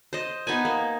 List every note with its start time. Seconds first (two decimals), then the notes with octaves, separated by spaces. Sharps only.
0.13 C5 D#5
0.47 B3 D#4 B4 G#5
0.65 A#3